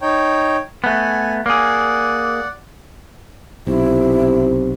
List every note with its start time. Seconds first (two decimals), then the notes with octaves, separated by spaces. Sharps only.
0.01 D#4 C#5 G5
0.84 A3 B3 F#5 G#5
1.46 A#3 G#4 D5 F#5
3.67 B1 C3 E4